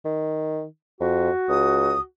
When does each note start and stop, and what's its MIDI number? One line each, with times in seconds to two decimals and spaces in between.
0.05 0.65 51
1.01 1.30 41
1.01 2.05 66
1.49 1.96 37
1.49 2.00 87